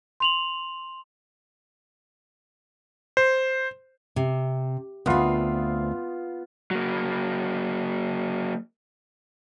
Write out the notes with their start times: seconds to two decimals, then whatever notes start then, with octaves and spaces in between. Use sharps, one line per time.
0.20 C6 F7 F#7
3.17 C5
4.16 C3
5.06 D2 B3 C4 F4
6.71 F#3 A#3